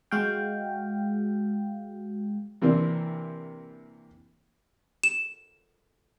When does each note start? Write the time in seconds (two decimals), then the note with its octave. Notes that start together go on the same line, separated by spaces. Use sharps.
0.11 G#3 F#4 F5 G5
2.62 C3 E3 A#3 C4 D4
5.04 E7